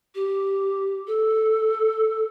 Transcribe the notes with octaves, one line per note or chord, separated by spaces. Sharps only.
G4
A4